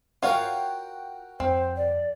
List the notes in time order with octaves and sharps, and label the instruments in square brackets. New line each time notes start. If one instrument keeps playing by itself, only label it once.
[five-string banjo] F4 C#5 F5 [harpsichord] F#4 A#4 G5
[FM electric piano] F2 [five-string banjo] C4 [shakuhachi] C5
[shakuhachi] D5